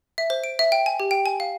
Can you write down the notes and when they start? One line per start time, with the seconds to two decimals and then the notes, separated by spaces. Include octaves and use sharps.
0.18 E5
0.30 C5
0.44 D7
0.59 E5
0.72 G5
0.86 G#5
1.00 G4
1.11 G5
1.26 G#5
1.40 F5